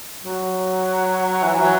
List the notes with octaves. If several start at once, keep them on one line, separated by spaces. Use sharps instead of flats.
F#3
E3
F#3